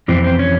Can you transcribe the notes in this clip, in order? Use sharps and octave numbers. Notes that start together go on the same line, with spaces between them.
F2 C3 E3 C4
C4
C#4